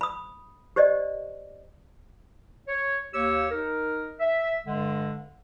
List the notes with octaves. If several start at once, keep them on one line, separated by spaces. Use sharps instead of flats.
B5 D#6
G4 C5 D5 D#5
C#5
D#2 A#3 G4 C#5 E6
D#4 A#4
E5
G2 D3 G#3